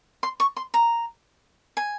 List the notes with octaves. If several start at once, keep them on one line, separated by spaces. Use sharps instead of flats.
C6
C#6
C6
A#5
G#5